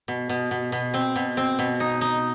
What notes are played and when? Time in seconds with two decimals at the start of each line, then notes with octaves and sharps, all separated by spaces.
0.08 B2
0.29 B2
0.51 B2
0.72 B2
0.94 C4
1.16 B2
1.37 C4
1.59 B2
1.80 D#4
2.01 D#4